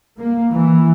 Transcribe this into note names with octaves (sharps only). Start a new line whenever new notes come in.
A#3
E3